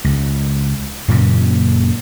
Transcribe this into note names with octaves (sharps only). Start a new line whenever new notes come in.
C#2
F#2 A#2 C#3 A#3